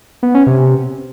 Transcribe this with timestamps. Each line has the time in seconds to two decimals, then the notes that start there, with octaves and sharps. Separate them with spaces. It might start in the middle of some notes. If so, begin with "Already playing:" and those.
0.23 B3
0.35 C#4
0.47 C3